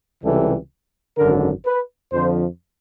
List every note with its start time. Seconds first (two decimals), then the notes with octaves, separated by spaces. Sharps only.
0.23 C#2 C3 E3 G3 A4
1.18 G#1 F#2 D3 A#4
1.66 B4
2.13 F2 D3 F3 C5